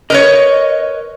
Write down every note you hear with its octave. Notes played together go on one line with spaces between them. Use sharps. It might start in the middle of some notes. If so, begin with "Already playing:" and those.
A#4 B4 C#5 D#5